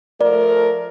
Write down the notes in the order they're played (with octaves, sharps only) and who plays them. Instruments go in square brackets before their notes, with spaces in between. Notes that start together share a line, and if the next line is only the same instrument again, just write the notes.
[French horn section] F3 A3 A#4 [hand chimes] D5